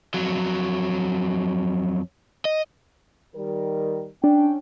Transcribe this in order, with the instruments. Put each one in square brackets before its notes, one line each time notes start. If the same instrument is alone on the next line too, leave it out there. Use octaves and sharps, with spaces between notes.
[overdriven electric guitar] F2 F#3
D#5
[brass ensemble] D#3 G3 A#4
[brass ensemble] C#4 G5 [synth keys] D4